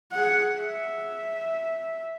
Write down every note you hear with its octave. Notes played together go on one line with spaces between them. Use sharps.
G#4 F#5
E5